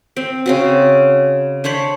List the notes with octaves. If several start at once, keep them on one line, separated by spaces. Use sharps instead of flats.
C4
C#3 C4 F#4
D4 C5 C#5 B5